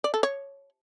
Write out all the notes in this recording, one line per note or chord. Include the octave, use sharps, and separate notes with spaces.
D5
A4
C#5